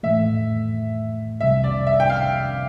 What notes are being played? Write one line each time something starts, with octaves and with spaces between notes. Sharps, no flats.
A2 E3 A3 E5
C2 C3 G3 E5
D5
E5
G5
F5